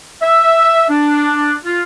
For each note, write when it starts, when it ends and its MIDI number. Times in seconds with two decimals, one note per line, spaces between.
0.22 0.84 76
0.90 1.54 62
1.65 1.82 65